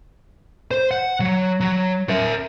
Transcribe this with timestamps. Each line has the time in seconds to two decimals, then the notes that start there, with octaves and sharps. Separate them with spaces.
0.71 C5
0.91 F#5
1.20 F#3
1.60 F#3
2.09 A#4 E5